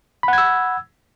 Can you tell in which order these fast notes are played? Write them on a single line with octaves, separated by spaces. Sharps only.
B5 F#5 G#6 E6